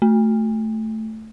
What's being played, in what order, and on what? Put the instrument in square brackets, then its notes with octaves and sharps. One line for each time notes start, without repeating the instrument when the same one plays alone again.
[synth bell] A3